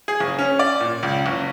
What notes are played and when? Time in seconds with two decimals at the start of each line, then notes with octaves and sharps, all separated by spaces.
0.08 G#4
0.20 F#1
0.39 C#4
0.59 D5
0.80 A#2
1.03 C#2
1.26 F#1